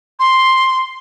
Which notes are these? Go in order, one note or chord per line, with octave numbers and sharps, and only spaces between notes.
C6